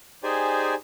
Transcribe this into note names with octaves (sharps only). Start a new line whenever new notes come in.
D#4 G4 G#4 C5 D5 G#5